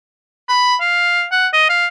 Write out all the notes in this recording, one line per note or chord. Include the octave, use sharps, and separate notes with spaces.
B5
F5
F#5
D#5
F5